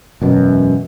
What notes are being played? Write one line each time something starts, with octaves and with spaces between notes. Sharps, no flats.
E1 F#2 B2